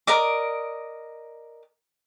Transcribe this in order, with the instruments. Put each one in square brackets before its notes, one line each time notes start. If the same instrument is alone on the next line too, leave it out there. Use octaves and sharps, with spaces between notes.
[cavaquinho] A#4 D5 D#5 D6